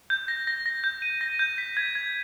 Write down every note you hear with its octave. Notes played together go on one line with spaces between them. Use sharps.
G6
A#6
A#6
A#6
G6
D#7
A#6
G6
B6
G#6
G#6